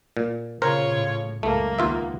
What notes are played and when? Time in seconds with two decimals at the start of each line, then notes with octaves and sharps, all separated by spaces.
0.17 A#2
0.62 A#2 C#3 F4 A#4 C5 C#5
0.96 A2
1.43 C#2 F#2 A3 A#3
1.79 D#2 B3 F4 E5